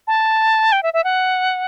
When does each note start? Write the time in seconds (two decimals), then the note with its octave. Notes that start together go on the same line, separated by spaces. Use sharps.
0.07 A5
0.72 G5
0.83 E5
0.94 E5
1.04 F#5